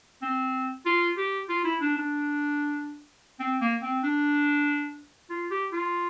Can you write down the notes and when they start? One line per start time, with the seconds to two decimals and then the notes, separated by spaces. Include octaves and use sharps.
0.22 C4
0.86 F4
1.17 G4
1.49 F4
1.65 E4
1.81 D4
1.97 D4
3.39 C4
3.61 A#3
3.82 C4
4.03 D4
5.30 F4
5.51 G4
5.73 F4